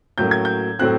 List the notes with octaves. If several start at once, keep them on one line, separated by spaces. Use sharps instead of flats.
A2 F#3 A#3 C#4 G6
G#6
G6
A2 F#3 A3 C4 F#6